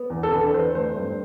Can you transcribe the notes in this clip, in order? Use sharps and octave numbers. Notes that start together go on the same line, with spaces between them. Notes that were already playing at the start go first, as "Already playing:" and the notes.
Already playing: B3
E2
A4
D3 B4
E2 C5
A3 C5
G2